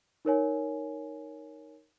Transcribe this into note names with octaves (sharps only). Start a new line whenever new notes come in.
D#4 A#4 C#5 G#5